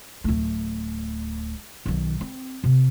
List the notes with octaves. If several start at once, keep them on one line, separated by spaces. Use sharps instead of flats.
D1 A3
B1 D#3
C4
C3